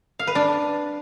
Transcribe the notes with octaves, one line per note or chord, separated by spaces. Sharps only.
F5
B4
D4